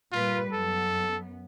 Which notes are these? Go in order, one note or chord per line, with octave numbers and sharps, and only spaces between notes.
A#2 G3 F4 B4
F#2 B3 A4